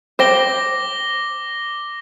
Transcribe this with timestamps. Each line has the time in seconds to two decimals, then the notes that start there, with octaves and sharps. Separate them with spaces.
0.19 C5 G5 D6 A#6 G7